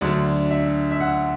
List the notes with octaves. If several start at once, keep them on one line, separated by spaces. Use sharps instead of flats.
D2 D3 F#3 D4 D5
E5
E5
F#5